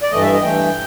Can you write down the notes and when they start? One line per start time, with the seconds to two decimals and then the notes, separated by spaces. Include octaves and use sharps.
0.03 D5
0.12 G2 E3 A3 D#5
0.22 E5
0.32 D#5
0.41 G2 E3 A3 G5